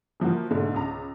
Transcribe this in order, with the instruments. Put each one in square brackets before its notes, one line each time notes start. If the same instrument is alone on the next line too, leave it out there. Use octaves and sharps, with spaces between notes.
[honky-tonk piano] E3 F3 A#3 F#4
G#2 B2 D3 A3
C#2 A#5